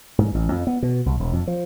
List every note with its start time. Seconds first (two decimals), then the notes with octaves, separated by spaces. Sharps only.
0.18 G#2
0.35 A1
0.52 F2
0.67 B3
0.83 B2
1.06 C2
1.20 E1
1.33 F2
1.47 F3